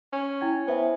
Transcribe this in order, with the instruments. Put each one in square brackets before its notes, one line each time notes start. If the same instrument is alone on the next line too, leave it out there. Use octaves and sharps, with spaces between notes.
[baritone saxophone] C#4
[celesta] E4 G5 G#6
[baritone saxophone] B3 [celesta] C5 E5 G#5